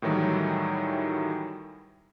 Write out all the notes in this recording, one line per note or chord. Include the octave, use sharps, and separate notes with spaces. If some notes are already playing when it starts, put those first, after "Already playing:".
A2 D#3 E3 F#3 G3